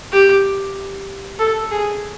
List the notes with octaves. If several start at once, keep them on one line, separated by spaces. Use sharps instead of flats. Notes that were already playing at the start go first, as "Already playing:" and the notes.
G4
A4
G#4